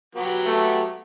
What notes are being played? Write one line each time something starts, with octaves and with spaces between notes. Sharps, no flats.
F#3 B3 G4
A3